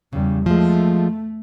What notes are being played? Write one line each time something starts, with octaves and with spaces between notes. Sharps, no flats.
E2 C#3 G3
F3 G#3 A3